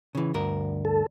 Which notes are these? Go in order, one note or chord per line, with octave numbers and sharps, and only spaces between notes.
C#3 E3
D2 G2 A#4
A4